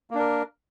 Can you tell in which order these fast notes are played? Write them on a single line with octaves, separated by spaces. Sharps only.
A#3 D4 A#4